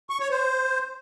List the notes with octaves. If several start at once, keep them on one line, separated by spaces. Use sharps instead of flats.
C#6
C#5
C5